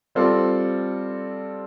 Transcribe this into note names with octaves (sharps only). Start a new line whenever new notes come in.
G3 C4 F4 A4 D5